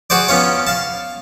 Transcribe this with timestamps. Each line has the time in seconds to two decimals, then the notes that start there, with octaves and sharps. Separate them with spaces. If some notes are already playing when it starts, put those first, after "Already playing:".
0.10 F#4 G#4 C5 D5
0.28 B3 C#4 F4 C#5
0.67 F5 A5